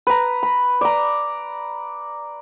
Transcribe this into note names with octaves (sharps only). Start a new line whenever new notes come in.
B4 A#5
B5
D5 A#5